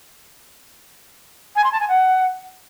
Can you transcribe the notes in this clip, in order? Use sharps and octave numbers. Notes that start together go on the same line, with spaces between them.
G#5
C6
A5
G#5
F#5